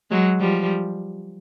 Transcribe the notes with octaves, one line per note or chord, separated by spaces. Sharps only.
F#3 G#3
F3 G3